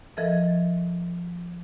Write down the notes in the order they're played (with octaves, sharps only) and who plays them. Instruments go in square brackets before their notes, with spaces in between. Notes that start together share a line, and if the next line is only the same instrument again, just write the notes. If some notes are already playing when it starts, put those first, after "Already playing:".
[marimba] F3 A4 A#4 D#5 E5 A6